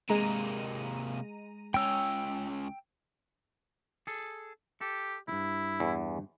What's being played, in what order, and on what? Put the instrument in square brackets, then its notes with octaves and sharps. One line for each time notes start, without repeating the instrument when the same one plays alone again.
[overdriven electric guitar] C3 A#3 [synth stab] G#3 A#5 D#7
[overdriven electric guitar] C#2 C#4 [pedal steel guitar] G5 E6
[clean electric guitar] G#4 A4
[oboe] G4 [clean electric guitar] A4
[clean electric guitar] D2 G2 [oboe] E4
[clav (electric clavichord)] E2